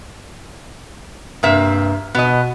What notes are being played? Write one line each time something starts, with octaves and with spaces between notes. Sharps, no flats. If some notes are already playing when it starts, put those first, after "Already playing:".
G2 C3 A#3 E5
B2 B3 D#5